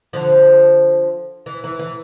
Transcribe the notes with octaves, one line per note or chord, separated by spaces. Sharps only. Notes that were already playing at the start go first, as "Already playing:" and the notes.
D3 F3
E3
E3
E3